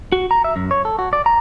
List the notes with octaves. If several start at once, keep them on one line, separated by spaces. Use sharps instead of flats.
F#4
A#5
E5
F#2
C#5
A4
F#4
D5
A#5